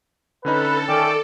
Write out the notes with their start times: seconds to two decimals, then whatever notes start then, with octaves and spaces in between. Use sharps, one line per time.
0.45 D3 C#4 D#4 A4 B4
0.89 D#3 A3 C#4 D5 G5